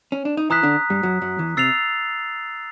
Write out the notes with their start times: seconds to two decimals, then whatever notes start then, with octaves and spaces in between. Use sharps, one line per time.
0.12 C#4
0.25 D4
0.37 D#4
0.50 E3 E4 A#5 D#6 F#6 B6
0.63 D3 D4
0.90 G2 G3
1.03 F#2 F#3
1.21 F#2 F#3
1.38 E2 E3
1.57 C3 E6 A6 C7 F7